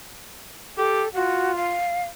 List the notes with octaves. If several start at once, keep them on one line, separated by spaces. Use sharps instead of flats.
G4 A4
F4 F#4
F5